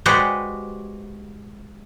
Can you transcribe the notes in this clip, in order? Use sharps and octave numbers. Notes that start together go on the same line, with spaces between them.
G#3 F#4 G4 B4 C5 D5